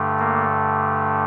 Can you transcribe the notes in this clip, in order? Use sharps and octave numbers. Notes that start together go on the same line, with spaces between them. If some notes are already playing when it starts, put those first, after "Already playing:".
Already playing: G2 D3 A3
A#3